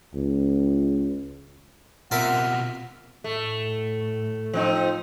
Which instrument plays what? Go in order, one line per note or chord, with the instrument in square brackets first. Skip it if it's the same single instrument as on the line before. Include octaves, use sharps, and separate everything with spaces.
[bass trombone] C#2
[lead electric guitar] B2 C4 [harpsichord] F4 A#4 E5 [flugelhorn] F#5
[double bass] A2 [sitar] A3
[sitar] F3 C4 D#4